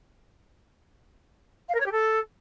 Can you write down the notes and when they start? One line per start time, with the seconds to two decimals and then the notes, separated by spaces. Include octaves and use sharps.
1.69 F5
1.74 A#4
1.80 C#5
1.86 G4
1.92 A4